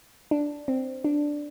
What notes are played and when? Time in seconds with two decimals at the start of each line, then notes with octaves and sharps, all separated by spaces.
0.31 D4
0.68 C4
1.05 D4